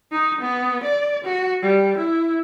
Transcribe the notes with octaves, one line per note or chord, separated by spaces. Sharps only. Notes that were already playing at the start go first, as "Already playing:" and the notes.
D#4
B3
D5
F#4
G3
E4